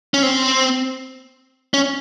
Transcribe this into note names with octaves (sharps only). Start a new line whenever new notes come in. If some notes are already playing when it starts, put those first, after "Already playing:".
C#4
C4
C#4